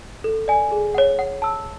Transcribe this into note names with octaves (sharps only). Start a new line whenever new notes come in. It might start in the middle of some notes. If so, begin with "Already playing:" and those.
A4
D5 G#5
G#4
C#5 F#5
F#5
A5 E6